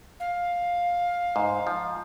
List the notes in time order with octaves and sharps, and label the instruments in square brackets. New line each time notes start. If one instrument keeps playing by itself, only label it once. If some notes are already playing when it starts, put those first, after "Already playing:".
[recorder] F5
[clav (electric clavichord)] G#2
F3